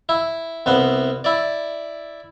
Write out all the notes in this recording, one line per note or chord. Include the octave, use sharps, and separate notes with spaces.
E4
C2 C3 B3 F#5
E4 D5